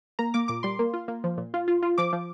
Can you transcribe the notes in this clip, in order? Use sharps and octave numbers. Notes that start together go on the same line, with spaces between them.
A#3 A#5
A#3 D6
A#2 D6
G3 C6
A#3
F4
A#3
F3
A#2
F4
F4
F4
F3 D6
F3